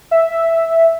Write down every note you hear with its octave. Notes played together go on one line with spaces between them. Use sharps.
E5
E5